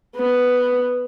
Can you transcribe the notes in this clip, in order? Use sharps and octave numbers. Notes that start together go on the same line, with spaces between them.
B3